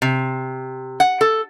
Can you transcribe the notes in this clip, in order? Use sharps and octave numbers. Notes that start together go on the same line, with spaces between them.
C3
F#5
A4